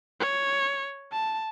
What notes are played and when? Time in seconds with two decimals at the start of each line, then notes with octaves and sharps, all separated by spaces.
0.20 C#5
1.13 A5